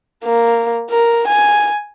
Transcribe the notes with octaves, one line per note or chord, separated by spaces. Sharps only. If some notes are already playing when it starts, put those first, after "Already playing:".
A#3
A#4
G#5